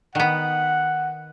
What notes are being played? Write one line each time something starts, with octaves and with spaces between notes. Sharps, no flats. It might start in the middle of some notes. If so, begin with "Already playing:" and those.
D#3 B3 F#5